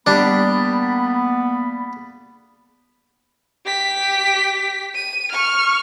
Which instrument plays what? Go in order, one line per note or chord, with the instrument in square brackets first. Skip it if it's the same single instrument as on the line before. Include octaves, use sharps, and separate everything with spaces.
[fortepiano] G3 [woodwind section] A#3 B3 B5 [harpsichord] D4
[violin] G4 B6
D#7
C#6 F6